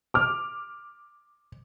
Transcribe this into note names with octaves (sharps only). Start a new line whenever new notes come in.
D6 F6